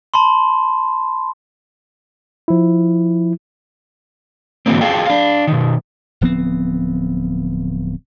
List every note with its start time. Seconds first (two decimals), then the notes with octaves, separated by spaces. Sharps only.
0.14 A5 B5 C6
2.48 F3 E4
4.66 G#2 D3 E3 F#3 A#3 C4
4.81 F4 G#4 A4 F5 G5
5.06 D4 F5
5.47 B2 D#3
6.21 D1 F3 B3 C4